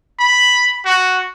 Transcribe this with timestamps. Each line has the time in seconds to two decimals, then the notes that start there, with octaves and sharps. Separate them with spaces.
0.19 B5
0.85 F#4